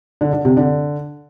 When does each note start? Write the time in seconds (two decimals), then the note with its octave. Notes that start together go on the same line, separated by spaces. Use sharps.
0.21 D3
0.33 D3
0.45 C3
0.57 D3